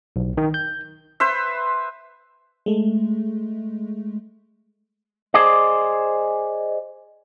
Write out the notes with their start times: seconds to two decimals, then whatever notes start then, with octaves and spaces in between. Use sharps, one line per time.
0.16 B1
0.37 D#3
0.54 G6
1.20 B4 C5 E5
2.66 G#3 A3
5.34 G#4 C5 D5 D#5